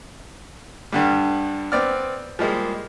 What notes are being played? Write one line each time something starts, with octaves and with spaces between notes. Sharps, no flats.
G2 D3 G3
B3 C4 D5 F6
F3 G3 G#3 A#3